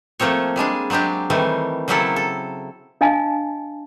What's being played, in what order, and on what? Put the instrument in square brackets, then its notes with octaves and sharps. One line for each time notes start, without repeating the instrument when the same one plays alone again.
[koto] F3 A3 A#3 C4 C#5
G3 G#3 D4 G#4
F#3 G#3 C4 D4 G4
D#3 E3 G3 A3 C4
C#3 F#3 A#3 C4 E4 A4
A4
[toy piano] D4 D#5 F5 G#5 A5